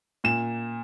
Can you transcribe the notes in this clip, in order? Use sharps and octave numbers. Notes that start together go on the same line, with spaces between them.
A#2 E7